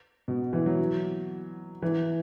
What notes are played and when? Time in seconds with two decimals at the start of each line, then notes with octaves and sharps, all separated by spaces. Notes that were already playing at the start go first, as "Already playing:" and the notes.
0.28 B2
0.53 E3
0.66 F#3
1.82 E3